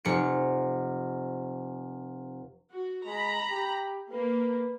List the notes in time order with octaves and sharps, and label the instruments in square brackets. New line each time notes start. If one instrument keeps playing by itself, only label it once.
[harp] F1 C#7
[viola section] F#4
[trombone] G#3 [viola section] A#5 B5
[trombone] G4
[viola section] A#3 [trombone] B4